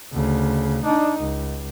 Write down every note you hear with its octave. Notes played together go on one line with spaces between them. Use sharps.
D2 C#3
D4 D#4
C#2